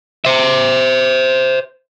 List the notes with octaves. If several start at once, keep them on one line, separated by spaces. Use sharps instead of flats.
C5 E5